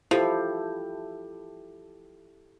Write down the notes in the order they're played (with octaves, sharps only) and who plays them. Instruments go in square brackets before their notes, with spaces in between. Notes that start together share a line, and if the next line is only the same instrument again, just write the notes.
[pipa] F3 [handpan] E4 G4 A4